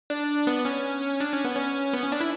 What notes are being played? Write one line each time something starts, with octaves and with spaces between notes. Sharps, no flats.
D4
B3
C#4
D4
C#4
B3
C#4
B3
C#4
D4
E4